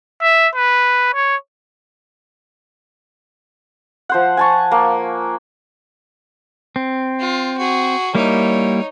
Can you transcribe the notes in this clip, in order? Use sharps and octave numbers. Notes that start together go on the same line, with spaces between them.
E5
B4
C#5
F3 C5 F#5
G#5 A5 C#6
A#3
C4
F4
F#4 G#4
G3 A#3 D#4 E4 C#5